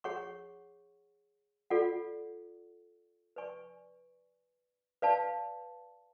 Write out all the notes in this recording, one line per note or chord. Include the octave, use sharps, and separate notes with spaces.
G#4 C#5 F#5 C#6
F4 A4 D5 F#5
B4 D5 G#5 C#6
B4 D5 F5 A5